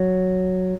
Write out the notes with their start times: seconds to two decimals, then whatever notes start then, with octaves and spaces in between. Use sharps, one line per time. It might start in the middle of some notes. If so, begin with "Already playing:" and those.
Already playing: F#3